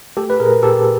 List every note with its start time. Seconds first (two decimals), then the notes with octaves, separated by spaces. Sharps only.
0.17 A3 G4 A4
0.30 B4
0.40 A#2 G#4 A#4
0.63 A#2 G4 A4